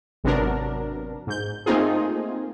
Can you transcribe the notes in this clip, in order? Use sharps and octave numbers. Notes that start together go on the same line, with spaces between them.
G#1 C3 F#3 B3 D4 A#4
G#2 G6
A3 A#3 C4 D#4 F4 G#4